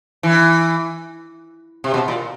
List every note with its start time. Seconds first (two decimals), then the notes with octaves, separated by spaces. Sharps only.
0.23 E3
1.84 C3
1.94 B2
2.08 A#2